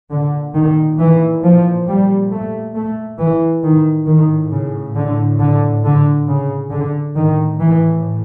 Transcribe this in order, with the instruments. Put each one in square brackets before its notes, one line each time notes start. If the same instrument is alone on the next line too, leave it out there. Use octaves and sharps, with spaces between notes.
[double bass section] A#2 D3
D#3
E3
F3
G3
A3
A3
E3
A2 D#3
D#3
C#3
D3
D3
D3
C#3
D3
A2 D#3
E3